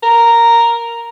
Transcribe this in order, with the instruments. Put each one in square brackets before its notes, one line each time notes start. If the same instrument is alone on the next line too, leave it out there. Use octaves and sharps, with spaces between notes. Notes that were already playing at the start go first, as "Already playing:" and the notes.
[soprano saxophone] A#4